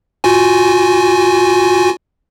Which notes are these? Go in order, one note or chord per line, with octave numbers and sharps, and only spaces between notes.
F4 F#4 G#5